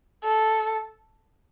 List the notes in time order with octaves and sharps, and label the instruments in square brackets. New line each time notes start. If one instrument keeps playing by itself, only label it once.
[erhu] A4